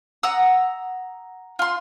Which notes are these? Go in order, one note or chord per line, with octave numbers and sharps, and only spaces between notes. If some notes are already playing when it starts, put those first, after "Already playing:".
F#5 A#5 D#6 E6
F4 C6